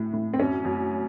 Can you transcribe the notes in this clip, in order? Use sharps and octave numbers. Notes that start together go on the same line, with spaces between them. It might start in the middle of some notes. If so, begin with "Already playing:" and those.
Already playing: A2
A2
C4
F#2 C#4
F#2